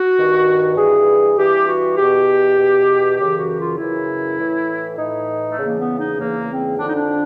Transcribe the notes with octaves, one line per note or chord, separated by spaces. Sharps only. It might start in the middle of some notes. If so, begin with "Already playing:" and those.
Already playing: F#4
G2 D#3
G2 E3 G#4
G2 E3 G4
F#4
E2 B2 G4
E2 B2
F#2 C#3 E3 G4
F#4
F4
F#2 C#3 E3 E4
A2 E3
A2 E3 D#4
A3
E2 C#3 E3
A#3
B3
D#4
E2 C#3 E3 A#3
C4
F2 D3 D4
D#4
D4